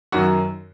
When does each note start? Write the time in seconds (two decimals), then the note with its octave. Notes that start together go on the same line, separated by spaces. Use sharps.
0.12 F#2 D#3 F#3 F#4